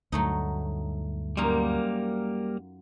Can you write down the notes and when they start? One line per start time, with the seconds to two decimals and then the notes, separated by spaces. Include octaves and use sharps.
0.12 D2 G2 F#3 A3 D#4
1.37 F#2 G3 A#3 D#4 F4